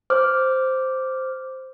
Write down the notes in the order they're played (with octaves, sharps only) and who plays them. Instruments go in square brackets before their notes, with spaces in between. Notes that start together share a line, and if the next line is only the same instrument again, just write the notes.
[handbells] C5 D6 F6